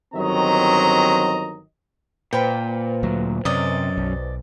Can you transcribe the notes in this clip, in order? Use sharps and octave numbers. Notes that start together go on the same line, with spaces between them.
G1 D#3 F#3 C4 D#5 A#5
A#2 B4 C5 G5 B5
D2 F#3
F#2 C3 D5 D#5
B1